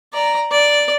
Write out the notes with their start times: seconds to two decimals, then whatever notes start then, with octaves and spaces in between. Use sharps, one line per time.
0.14 D5 A#5
0.51 D5